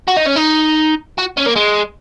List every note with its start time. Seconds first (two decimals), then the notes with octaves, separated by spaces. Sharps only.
0.08 F#4
0.17 D#4
0.26 C#4
0.36 D#4
1.18 F#4
1.38 C#4
1.47 A#3
1.56 G#3